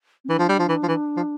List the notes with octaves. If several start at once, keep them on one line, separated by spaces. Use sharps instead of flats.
C4
E3 D4
F3
G3
F3
E3
F3
E3
F3